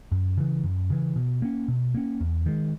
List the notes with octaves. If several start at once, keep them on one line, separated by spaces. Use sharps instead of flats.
F#2
C#3 E3
F#2
C#3 E3
B2
A#3 C#4
B2
A#3 C#4
E2
D#3 G#3